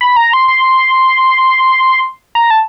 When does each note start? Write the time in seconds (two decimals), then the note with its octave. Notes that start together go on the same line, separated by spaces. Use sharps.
0.01 B5
0.16 A#5
0.33 C6
0.48 C6
2.35 A#5
2.51 A5